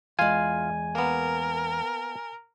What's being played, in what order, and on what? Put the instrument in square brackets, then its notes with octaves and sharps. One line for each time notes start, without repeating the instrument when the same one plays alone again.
[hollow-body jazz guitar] E2 G#3 [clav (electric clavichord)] F4 F5 [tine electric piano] G#5
[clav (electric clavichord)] A#3 B3 [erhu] A#4